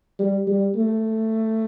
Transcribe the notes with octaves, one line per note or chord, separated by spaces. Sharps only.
G3
G3
A3